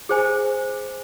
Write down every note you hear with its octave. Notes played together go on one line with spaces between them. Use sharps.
G#4 C5 G#5